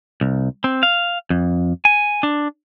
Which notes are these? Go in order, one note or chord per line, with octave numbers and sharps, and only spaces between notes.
C2
C4
F5
F2
G#5
D4